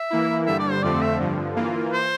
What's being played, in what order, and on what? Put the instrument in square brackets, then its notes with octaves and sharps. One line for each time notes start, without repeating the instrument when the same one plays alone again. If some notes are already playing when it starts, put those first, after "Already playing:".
Already playing: [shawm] E5
[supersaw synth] E3 A#3 E4
[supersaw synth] G2 D3 G3 [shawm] E5
[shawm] D5
C5
[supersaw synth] F2 D3 F3 A3 C4 [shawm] D5
[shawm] E5
[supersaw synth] G2 D3 F3
E3 A#3 F4
[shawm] C5